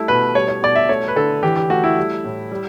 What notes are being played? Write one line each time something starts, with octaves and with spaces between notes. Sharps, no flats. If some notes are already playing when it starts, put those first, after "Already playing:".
Already playing: G3 A3 E4
B2 B4
G3 C#5
C#5
B2 D5
E5
A3 C#5
B4
D3 A4
E3 G4
G4
A3 F#4
E4
G3
A2
G3